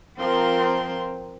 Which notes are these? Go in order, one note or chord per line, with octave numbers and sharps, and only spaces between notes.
F3 C4 A#4 C6